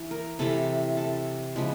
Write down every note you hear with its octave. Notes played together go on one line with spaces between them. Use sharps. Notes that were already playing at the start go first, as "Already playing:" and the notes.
Already playing: E3
A#4
C3 E3 A3 A4
A4
C#3 F3 G#3 B3